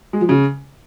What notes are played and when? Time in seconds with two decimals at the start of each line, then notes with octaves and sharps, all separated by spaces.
0.13 G#3
0.21 F3
0.29 C#3